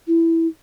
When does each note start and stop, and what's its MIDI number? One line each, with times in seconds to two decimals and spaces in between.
0.08 0.47 64